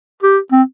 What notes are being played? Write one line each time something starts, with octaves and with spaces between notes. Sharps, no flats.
G4
C4